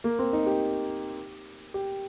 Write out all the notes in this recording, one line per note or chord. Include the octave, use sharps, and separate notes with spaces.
A#3
C4
D#4
G4
G4